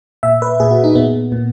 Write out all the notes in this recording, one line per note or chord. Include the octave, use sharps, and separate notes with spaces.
A#2 E5
B4
A#2 G#4
F#4
D#4
A#2 B3
A#2